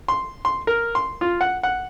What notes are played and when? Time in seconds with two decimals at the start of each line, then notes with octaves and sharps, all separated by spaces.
0.08 C6
0.45 C6
0.67 A#4
0.95 C6
1.21 F4
1.41 F#5
1.63 F#5